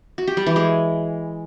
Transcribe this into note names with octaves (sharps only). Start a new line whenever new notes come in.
F#4
G4
G3
E3
G#3